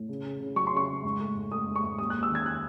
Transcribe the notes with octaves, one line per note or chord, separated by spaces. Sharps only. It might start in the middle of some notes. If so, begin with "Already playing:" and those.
Already playing: A2
C#3
C#3
C#3
F#3 C#6
C6
C#3 C#6
C#3
G#2
A3
G#2
A3 D#6
G#2
C#6
G#2
D#2 D#6
F#6
D#2
E6
D#3 G#6
F#6